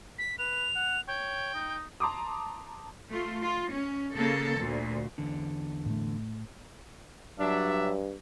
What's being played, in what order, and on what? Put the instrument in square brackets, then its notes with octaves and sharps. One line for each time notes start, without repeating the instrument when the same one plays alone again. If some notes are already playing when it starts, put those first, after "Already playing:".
[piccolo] B6
[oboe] B4 [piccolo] F7
[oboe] F#5
[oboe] C#5 [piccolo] G5
[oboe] D#4
[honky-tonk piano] A5 A#5 C6 D6 D#6
[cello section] A3 F4
F4
C#4
C#3 A#3 A4
D2 A#2
[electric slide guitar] E2 D3
[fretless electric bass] A2 A3
[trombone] G2 [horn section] F#3 D4 E5